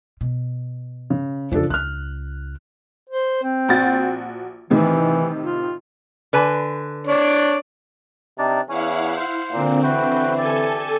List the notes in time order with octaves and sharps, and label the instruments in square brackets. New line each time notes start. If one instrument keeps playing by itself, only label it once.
[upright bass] B2
[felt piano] C#3
[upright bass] E2 C#3 [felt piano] F3 D4 A4
[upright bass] C#2 [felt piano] F6 F#6
[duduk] C5
C4
[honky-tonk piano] A#1 F#4 A6
[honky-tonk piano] A2 C3 D#3 [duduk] E3
[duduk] F4
[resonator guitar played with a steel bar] D3 B4 G#5
[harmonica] D4 C#5 D5
[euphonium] C3 [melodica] D4 D#4 D5
[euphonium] E2 [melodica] C#4 [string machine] E4 F5 F#5
[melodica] C5
[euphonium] A#2 [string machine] D3 C4
[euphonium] E3 [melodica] F#4 B4 G5
[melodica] G4 D5 [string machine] A4 G#5